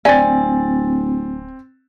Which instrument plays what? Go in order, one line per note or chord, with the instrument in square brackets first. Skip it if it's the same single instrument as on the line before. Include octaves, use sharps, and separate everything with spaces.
[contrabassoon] D1 [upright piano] C4 A6 [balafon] D5 [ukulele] G#5